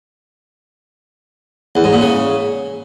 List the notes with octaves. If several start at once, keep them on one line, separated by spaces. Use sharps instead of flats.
E2
G#2
A#2
C#3